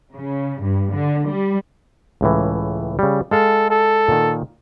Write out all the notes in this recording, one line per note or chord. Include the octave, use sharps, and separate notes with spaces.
C#3
G2
D3
G3
C#2 A2 E3
C#3 G3
G#3 A4 F5 A5
A4
A#2 D#3